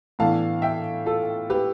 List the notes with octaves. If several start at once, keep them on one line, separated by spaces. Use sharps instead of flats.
A2 E3 B3 D4 F5 A5
E5 G5
F4 A4
G4 B4